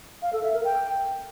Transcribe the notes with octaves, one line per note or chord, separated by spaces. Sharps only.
F5
A4
E5
A#4
G5